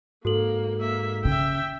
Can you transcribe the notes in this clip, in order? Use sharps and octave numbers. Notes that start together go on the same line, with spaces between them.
G#2 A#3 F#4 A4 F#7
A#3 E5
C#3 E5 G5